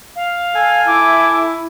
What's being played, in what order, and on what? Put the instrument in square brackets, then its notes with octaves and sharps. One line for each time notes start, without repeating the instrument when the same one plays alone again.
[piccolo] F5
[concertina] A4 G#5
[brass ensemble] E4 [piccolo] D6